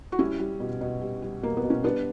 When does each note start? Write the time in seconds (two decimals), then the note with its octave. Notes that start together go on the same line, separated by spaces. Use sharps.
0.12 F#4
0.19 G3 C#4 E4
0.40 G3
0.60 B2
0.81 B2
1.02 G3
1.22 G3
1.43 B2 A#3
1.57 B3
1.64 B2
1.70 C#4
1.84 G3 B3 D4